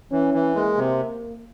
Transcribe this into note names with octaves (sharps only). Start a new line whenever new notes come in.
E3 C#4
E3
G#3 A#3
C3